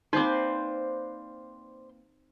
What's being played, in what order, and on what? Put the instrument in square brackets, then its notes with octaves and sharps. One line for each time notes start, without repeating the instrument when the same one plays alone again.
[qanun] A#3 C4 B4 [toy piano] D#4 [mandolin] C5 D5